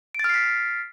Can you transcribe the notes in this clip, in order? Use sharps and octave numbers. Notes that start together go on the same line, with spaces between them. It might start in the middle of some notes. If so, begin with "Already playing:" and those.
F6 A6 B6 C7 D7